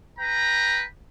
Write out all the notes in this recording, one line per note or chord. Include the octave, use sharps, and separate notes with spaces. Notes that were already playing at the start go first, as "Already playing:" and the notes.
B4 G5 A#5